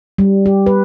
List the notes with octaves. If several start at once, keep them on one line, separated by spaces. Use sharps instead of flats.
G3
G4
B4